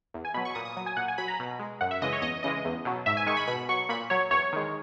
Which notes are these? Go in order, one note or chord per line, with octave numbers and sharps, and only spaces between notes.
E2
G#5
B2 F#3 B5
C#6
A#2 D#6
D#6
F#3 D#6
G#5
A#2 F#5
G#5
F#3 B5
A#5
B2
G#3
F#2 F#5
E5
C#3 E3 G#3 D#5
C#5
E2 D#5
C#3 E3 G#3 D#5
E2
B2 F#3
G#2 E5
G#5
D#3 G#3 C#6
B5
B2 B5
F#3 C#6
A#2 B5
F#3 C#5
E2 C#5
D#3 G#3